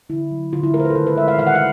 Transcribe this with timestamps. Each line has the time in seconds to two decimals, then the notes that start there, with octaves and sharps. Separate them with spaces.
0.09 D3 E4
0.31 F#3
0.52 D3 F4
0.63 E4
0.74 A3 A#4
0.80 C5
0.85 B4
0.90 A4
0.95 D#3 A#4
1.07 B4
1.17 G#3 E5
1.28 F5
1.38 D#3 F5
1.47 F#5
1.55 F5